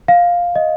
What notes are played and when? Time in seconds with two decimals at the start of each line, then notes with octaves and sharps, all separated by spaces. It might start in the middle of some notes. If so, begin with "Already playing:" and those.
0.08 F5
0.56 D#5